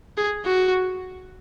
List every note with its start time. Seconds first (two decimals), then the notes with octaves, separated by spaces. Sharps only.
0.17 G#4
0.45 F#4